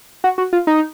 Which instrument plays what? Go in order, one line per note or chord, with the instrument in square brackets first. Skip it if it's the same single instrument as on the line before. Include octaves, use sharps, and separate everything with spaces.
[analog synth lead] F#4
F#4
F4
D#4